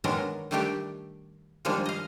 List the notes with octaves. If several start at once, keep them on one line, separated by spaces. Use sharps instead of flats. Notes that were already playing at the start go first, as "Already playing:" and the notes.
D#3 F#3 G#3 B3 D4 A#4
D#3 G3 A3 D4 G4 G5
D#3 F3 G3 G#3 A#3 D4
D#5 F5